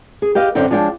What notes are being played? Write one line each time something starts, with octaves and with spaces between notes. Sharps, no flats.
G#4
G4 B4 D#5 F5
F#2 D3 C4 G5
F3 G#3 D4 C#5 G5